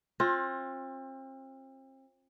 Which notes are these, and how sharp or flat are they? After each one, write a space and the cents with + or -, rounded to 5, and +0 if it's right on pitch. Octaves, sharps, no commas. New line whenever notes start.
C4 +35 F4 +20